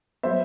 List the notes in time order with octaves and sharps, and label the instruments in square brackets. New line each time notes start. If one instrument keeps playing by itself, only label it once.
[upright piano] F#3 B3 C5 E5